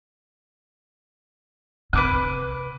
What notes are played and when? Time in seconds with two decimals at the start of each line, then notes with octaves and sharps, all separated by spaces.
1.93 C3 B4 D6 F#6